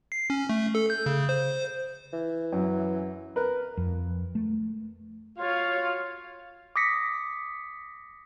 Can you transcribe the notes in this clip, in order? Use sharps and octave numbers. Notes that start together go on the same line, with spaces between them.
C7
C#4
A3
A4
G6
C#3
C5
E3
F#2
A#4 B4
F2
A3
F4 F#4 C#5 F5
D6 D#6 A#6 B6 C#7